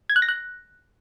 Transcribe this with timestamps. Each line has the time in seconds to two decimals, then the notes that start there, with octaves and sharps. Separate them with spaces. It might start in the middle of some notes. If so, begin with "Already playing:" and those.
0.10 G#6
0.16 F#6
0.22 A#6
0.29 F#6